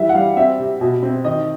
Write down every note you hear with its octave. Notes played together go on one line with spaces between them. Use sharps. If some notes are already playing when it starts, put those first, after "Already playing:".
Already playing: E3 G3 E5
F#5
G3 F5
C4 E5
C3
B2
C4
D#3 D#5